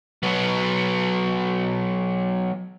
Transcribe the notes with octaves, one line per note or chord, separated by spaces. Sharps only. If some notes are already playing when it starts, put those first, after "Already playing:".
F#3 B3